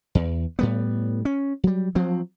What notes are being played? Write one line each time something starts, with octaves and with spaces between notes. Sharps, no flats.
E2
A2 G3 B3
C#4
F#3 G3
F3 F#3 C4